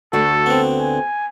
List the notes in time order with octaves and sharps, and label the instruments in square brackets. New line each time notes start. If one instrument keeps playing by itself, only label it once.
[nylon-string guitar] D2 D3 F#4 [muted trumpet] A4
[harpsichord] B3 C4
[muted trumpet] G#5